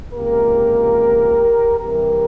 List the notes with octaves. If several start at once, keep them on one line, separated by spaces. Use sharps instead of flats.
C#2 C3 F3 A#3 G4 A#4
C2 C3 E3 G4 A#4